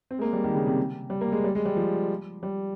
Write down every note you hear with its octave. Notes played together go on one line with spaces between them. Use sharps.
C4
G#3
A#3
G3
D#3
C#3
C3
G3
A#3
G#3
G3
G#3
G3
F3
G3